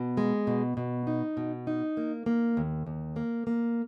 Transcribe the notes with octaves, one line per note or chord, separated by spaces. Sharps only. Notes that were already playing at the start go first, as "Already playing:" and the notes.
Already playing: B2
G#3
B2
B2
D#4
B2
D#4
A#3
A#3
D#2
D#2
A#3
A#3